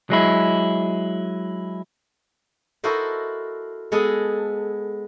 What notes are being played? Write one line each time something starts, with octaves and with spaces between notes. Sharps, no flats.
F#3 G#3 E4
E4 F#4 A4 A#4 C5 D#5
G#3 B3 G#4 A4 D#5